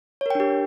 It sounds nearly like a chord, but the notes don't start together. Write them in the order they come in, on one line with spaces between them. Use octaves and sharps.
C#5 A#4 G5 D4 G4